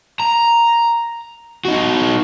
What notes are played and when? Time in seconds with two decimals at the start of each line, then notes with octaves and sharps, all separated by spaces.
0.20 A#5
1.65 D#4 F#4